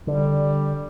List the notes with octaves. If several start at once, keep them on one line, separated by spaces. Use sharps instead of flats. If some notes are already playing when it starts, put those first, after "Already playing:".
D3 G3